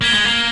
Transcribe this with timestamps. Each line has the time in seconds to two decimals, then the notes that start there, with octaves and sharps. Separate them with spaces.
0.01 A#3 G#6 B6 G7
0.14 G#3
0.25 A#3